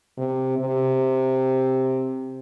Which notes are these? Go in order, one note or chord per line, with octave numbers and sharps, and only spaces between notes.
C3
C3